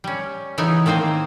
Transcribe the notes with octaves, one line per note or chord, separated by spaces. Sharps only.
G3 C#4
C#3 E3 B3 D#4 G#5
D#3 A#3 C4 C5 G#5